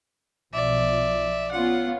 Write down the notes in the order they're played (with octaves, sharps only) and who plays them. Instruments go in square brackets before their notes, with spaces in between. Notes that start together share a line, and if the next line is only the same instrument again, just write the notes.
[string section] B1 F3 [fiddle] D5 E5
[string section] B3 C#4 F4 [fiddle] F#5